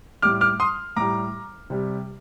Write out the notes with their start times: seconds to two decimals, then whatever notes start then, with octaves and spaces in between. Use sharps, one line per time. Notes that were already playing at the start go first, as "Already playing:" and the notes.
0.22 A2 G3 D6 F6
0.41 D6 F6
0.60 C6 D#6
0.96 A2 G3 A#5 D6
1.70 C3 G3